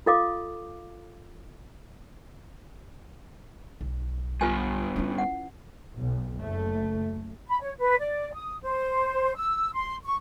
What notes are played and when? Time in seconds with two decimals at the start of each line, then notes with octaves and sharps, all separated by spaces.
0.06 F4 A4 D#5 F5 D6
3.81 B1
4.41 G2 B3 F4 B4 G#5
4.96 C#4 E4
5.18 F#5
5.95 B1
6.38 F#1 A3
7.48 B5
7.61 C#5
7.79 B4
7.99 D5
8.33 D#6
8.63 C5
9.36 E6
9.73 C6
10.04 C#6